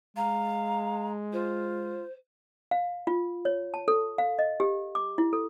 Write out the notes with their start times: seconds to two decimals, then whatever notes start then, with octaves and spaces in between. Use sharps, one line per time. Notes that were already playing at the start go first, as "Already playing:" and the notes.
0.16 G#3 F5 A#5
1.33 F4 C5
2.71 F5
3.07 F4
3.45 C#5
3.74 A5
3.88 A4
4.18 F5
4.39 D#5
4.60 G4
4.95 D6
5.18 E4
5.33 A4